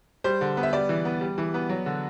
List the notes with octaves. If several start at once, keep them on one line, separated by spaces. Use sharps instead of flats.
G3 C5
D3
B3
E5
G3 D5
E3
B3
G3
E3
B3
F#3
D3